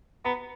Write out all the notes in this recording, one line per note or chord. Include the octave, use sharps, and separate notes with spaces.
B3 A#5